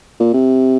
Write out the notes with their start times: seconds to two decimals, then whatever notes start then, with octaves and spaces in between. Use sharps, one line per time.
0.20 A#2
0.33 C3